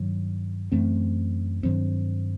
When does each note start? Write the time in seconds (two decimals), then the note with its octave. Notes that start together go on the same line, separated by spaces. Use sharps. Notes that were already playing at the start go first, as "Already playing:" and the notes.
Already playing: G2 D#3 F#3
0.72 F#2 E3 A3 C4
1.63 G2 D#3 F#3 C4